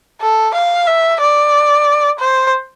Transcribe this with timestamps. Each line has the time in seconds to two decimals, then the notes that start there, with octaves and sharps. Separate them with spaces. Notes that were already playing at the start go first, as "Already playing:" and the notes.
0.21 A4
0.54 F5
0.86 E5
1.20 D5
2.19 C5